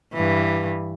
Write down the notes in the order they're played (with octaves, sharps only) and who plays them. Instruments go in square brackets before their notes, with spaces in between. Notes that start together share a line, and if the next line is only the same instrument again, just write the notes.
[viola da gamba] G2 E3